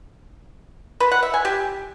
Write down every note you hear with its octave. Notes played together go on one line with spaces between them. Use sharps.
B4
F#5
E5
G#5
G4